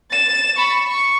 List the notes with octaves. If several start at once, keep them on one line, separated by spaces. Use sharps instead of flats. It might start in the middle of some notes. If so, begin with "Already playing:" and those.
A6 E7
B5 C#6
C#6